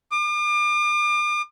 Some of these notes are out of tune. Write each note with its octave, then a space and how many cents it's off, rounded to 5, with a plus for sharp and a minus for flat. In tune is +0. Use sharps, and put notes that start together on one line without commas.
D6 +40